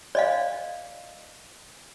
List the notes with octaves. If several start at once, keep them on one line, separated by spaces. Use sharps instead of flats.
D5 D#5 F5